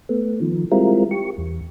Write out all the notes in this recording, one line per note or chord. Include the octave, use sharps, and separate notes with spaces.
A3 B3
D#3 F3
G3 G#3 C4 E4 F4 A#4
G4 C#6
E2